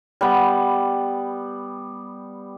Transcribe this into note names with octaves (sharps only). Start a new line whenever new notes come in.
G3 B3